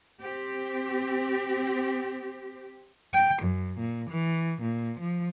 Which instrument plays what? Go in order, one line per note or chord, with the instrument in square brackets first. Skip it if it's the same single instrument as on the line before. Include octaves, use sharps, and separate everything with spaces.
[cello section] C4 G4
[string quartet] G5
F#2
A#2
E3
A#2
F3